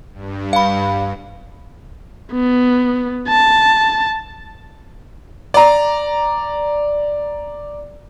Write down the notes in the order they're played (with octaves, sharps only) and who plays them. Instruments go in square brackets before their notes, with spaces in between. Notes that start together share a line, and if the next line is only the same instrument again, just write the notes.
[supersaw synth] G2
[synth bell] F5 B5
[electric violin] B3
A5
[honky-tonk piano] D5 A#5